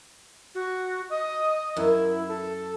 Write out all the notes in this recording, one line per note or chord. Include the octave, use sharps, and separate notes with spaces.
F#4
D#5
F#2 E4
A4